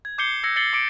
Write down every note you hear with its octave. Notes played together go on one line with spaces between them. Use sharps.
G#6
D6 G6 C7 C#7 G7
E6 G#6 A#6 C#7
G6 A6 C7 C#7 F#7 G7
D6 C#7 D7